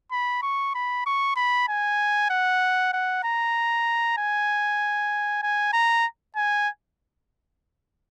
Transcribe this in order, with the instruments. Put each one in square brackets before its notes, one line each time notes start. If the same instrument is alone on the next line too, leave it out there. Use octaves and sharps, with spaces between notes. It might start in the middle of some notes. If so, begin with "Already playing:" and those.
[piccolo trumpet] B5
C#6
B5
C#6
B5
G#5
F#5
F#5
A#5
G#5
G#5
A#5
G#5